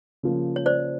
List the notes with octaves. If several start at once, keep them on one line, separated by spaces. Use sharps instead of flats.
C#3 F3 A#3
C#5
C5 D5